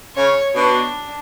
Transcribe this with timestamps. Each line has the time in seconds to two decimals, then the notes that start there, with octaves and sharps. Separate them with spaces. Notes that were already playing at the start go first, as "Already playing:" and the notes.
0.15 C#3 C#5
0.55 B2 D4